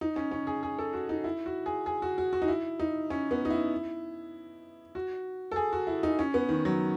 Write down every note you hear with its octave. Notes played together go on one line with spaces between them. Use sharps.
D#4
C#4
C#4
G#4
G#4
A4
F#4
D#4
E4
F#4
G#4
G#4
F#4
F#4
F#4
D#4
E4
D#4
C#4
B3
D#4
E4
F#4
A4
G#4
F#4
E4
D#4
C#4
B3
D#3
F#3